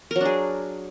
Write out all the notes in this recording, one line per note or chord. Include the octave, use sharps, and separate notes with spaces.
F#3 D4 G#4 A#4